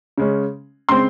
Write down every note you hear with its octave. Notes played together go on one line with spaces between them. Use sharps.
C#3 G#3 C#4
C#3 G#3 C4 C6